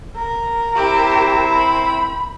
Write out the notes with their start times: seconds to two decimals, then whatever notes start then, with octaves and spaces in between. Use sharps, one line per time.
0.16 A#4
0.76 C4 E4 G4
1.56 B5